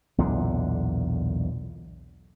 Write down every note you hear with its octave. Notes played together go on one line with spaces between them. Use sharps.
B1 E2 A#2 D3